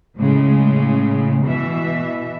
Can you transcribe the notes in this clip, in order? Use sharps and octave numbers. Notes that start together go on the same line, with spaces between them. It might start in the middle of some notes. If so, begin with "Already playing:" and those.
A2 C#3 G#3
B2 E3 E5